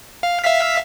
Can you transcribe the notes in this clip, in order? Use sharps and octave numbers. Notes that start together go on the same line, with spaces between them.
F5
E5 F5 B6